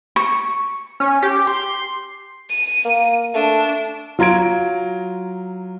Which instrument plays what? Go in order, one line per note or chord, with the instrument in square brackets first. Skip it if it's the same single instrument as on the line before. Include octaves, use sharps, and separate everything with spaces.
[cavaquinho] C#6
[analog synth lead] C#4
G4
C6
[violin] D#7
[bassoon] A#3
[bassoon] A3 [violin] D4
[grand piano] F#3 F4 A#5 G#6 D7